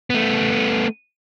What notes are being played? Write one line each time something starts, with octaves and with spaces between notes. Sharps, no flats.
A3 B3